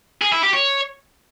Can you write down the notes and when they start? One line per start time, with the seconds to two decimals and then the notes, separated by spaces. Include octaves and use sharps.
0.21 G#4
0.32 E4
0.43 G4
0.53 C#5